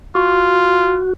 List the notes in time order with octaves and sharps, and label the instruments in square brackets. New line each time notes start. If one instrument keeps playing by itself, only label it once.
[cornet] F4 [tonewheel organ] F#4